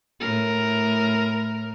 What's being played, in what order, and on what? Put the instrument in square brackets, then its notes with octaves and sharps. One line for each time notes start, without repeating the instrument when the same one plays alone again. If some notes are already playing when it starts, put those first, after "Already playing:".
[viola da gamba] A2 A#4